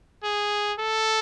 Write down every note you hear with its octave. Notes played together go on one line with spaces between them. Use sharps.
G#4
A4